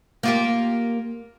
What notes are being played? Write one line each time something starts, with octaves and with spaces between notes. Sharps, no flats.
A#3 F4 G4